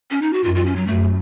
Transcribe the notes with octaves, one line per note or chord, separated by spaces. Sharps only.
C#4
D#4
F#4
F#2 F4
F4
C#4
F#3
F#2 A3